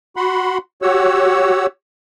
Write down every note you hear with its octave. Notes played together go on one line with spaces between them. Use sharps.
F#4 F#5 B5 C6
F#4 G4 C#5 F#5 E6